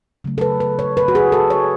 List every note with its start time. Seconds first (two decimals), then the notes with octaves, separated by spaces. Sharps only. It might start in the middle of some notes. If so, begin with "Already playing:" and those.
0.24 C#3 F#3 A3
0.38 A4
0.41 B4
0.60 B4
0.79 C#5
0.97 B4
1.08 F#4
1.15 G#4
1.32 A4
1.50 C#5